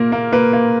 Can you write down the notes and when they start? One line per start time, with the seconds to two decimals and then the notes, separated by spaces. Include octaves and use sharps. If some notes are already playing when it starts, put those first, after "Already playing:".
Already playing: A#2 A#3 A#4
0.12 A#3
0.32 A#3 B4
0.53 A#3